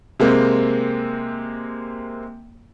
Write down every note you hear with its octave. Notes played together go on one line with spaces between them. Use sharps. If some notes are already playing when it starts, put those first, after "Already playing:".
C3 G#3 A#3 C4